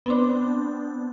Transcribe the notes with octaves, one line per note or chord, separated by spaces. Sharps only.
B3 C4 D4